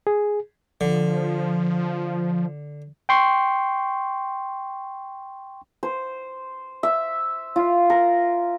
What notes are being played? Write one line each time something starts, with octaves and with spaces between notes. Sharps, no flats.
G#4
D3 F3
G5 C6 C#6
C5
E5
F4
A#4